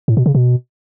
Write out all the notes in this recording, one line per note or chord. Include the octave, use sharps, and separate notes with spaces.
A2
B2
C#3
B2